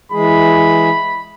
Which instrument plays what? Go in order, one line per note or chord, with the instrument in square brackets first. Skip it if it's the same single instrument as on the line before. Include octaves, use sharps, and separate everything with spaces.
[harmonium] E3 G#3 G#4 [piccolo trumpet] B5